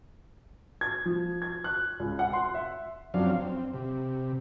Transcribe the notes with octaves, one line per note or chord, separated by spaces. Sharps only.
G#6
F3
G#6
F#6
C#2
F#5
C6
E5
F#2 F3 F#3 C4 D4 F5
C4
C3